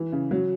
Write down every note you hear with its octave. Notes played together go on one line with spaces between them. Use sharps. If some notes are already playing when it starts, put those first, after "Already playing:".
Already playing: E3
C#3
F#3